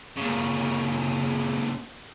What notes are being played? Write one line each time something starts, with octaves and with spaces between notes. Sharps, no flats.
A#2 C#3